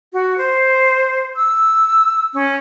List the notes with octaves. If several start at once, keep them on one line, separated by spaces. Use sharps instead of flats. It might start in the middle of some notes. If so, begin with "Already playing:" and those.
F#4
C5
E6
C#4